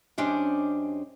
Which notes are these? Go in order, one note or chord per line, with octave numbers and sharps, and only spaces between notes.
F#2 C#4 D4 G4 C5 D#5